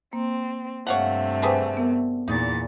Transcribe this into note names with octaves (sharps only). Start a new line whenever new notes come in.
A#3 C4
G2 C3 A3 C#5 F5 F#5
D3 G#4 B4 C5 G5
B3 A#4
E2 A#2 D#4 A6